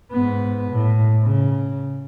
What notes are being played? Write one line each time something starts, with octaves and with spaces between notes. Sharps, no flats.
G#2 B3
A2
C#3